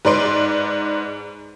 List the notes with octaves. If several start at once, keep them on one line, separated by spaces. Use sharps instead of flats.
G#2 B4 D5 C6 D7